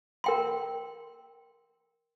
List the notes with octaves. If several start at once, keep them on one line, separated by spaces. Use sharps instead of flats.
A#4 G5 C6